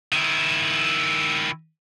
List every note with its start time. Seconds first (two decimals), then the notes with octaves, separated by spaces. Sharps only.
0.13 D#3 E4